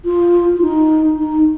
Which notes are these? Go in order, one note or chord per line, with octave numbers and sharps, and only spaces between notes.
F4
F4
D#4
D#4